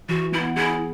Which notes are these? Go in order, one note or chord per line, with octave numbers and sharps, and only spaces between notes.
E3 F#4
B3 E4
E4 G#4